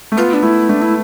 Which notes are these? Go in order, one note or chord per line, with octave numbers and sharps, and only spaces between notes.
A3
B3 F4
D4
A3 E4
A3 D4
E4